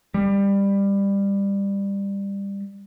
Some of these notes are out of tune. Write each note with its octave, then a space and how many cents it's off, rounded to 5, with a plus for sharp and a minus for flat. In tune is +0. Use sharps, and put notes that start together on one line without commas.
G3 +20